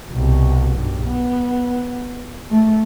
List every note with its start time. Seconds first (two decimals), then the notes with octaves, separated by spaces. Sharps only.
0.11 C2 B2
0.76 B1 G2
1.06 B3
2.51 A3